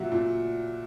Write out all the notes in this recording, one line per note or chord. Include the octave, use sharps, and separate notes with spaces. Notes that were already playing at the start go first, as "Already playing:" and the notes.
Already playing: A#2 F#3 E5 F#5
A#2